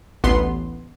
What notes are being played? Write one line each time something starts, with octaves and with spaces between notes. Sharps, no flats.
A1 D2 B3 C6